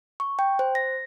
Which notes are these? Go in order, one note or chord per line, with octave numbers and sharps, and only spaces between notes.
C#6
G5
C5
A#6